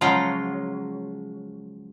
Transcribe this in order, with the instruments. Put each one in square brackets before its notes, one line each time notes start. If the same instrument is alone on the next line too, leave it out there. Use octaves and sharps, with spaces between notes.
[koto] C#3 F3 F#3 G#3 C#4 F4